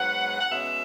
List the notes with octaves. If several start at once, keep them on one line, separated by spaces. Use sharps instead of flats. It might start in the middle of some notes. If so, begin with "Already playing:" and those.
Already playing: G#2 F#3 B3 F#5
F#5
B2 G#3 C#4 E5